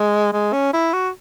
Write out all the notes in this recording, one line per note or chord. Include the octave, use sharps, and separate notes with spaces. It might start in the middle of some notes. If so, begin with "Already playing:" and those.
Already playing: G#3
G#3
C#4
E4
F#4